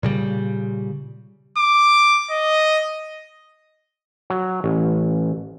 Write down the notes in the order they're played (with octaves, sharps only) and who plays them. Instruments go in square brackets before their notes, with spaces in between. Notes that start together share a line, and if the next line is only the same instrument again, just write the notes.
[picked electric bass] A#2 C#3 G3
[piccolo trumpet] D6
D#5
[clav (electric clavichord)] F#3
A1